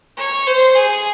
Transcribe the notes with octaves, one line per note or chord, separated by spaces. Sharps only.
C#5
C5
G#4